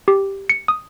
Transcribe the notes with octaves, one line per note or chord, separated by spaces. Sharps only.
G4
C#7
D#6